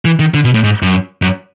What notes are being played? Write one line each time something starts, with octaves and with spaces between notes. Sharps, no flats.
E3
D#3
D3
B2
A2
G#2
F#2
F#2